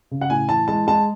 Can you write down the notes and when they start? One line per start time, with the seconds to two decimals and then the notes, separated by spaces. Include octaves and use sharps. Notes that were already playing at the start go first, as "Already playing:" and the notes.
0.11 C#3
0.21 F#5
0.30 A2 G#5
0.49 E3 A5
0.68 G#3 A5
0.87 G#3 A5